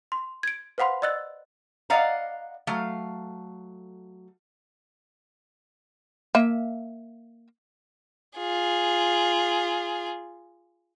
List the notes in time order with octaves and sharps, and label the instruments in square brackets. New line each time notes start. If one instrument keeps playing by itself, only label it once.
[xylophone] C6
G#6 D7
B4 C5 F5 F#5 B5 C6
D5 D#5 E6 F#6 A6
[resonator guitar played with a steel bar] D5 D#5 F5 F#5 A#5
F#3 A3 F5
[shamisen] A#3 E5
[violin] F4 G#4